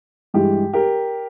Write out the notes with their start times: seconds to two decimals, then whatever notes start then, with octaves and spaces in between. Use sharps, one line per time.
0.34 G2 E3 G#3 G4
0.73 G4 A#4